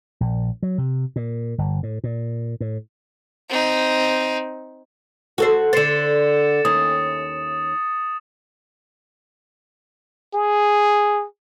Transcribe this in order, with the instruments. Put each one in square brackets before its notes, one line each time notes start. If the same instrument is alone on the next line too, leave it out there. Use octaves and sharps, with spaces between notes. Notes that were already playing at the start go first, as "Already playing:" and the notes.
[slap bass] A#1
F#3
C3
A#2
G1
A2
A#2
A2
[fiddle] C4 D#4
[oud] F#4 A4 C5
[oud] D3 C5 [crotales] A6 C#7 E7
[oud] D#2 C#4 [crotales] D#6
[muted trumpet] G#4